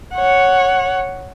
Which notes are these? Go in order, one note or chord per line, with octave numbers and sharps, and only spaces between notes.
C#5 F#5